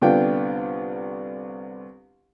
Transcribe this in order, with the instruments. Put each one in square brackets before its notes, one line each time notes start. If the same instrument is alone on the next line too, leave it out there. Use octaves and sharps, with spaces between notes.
[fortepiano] C2 D3 B3 F4 G5